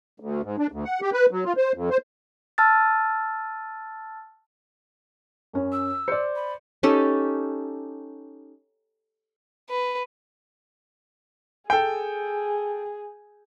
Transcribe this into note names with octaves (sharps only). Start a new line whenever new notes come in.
D2
G#2
D4
D2
F#5
G4
B4
F#3
F4
C5
F2
C5
A5 E6 F6 A6
F#2 C#4
E6
C5 D5 C#7
B5
C#4 D#4 G4 A4
B4
G#4 A4 G5